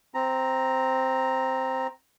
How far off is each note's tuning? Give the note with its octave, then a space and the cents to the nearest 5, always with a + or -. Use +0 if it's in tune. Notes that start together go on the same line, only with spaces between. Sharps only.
C4 +0 A#5 +0